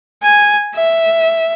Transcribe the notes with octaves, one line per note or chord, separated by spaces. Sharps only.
G#5
E5